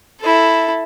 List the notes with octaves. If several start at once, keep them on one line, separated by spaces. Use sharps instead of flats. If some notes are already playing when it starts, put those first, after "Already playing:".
E4 A4